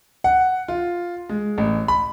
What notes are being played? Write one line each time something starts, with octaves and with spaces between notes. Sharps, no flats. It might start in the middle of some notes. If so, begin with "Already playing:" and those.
F#5
F4
G#3
A1
B5